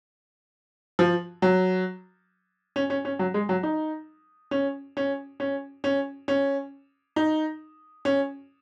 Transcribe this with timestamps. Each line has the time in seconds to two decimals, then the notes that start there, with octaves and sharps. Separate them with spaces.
0.99 F3
1.42 F#3
2.76 C#4
2.90 C#4
3.05 C#4
3.19 F#3
3.34 G#3
3.49 F#3
3.63 D#4
4.51 C#4
4.97 C#4
5.40 C#4
5.84 C#4
6.28 C#4
7.16 D#4
8.05 C#4